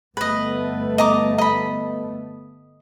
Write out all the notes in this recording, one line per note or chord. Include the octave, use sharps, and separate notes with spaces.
G1 A3 B3 B4 D#5
D#5 A#5 D6
D#5 B5